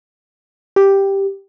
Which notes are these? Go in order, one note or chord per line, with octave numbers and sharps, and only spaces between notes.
G4